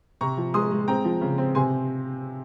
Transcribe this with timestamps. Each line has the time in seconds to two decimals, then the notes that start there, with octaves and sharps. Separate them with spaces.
0.21 C3 A#5 C#6
0.37 F3
0.54 G#3 C6 D#6
0.71 G#3
0.88 C4 G5 A#5
1.04 F3
1.21 C#3
1.38 C4
1.55 C3 G#5 C6